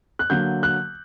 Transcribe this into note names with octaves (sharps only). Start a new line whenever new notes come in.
F#6
D3 F#3 A#3 G6
F#6